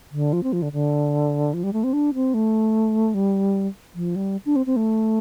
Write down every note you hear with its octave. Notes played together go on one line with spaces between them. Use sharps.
D3
F3
C4
F3
D3
D3
F3
G3
A3
C4
D4
C4
A3
G3
F3
G3
D4
C4
C4
A3